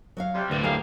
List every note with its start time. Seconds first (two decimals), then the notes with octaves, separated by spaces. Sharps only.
0.17 F#3 C#5 F5
0.35 C3 G3
0.51 D2 A2 B4
0.63 A3 A#3 G4 G#4 F5